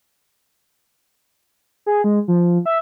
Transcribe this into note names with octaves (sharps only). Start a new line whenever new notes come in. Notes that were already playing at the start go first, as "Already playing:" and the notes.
G#4
G#3
F3
E5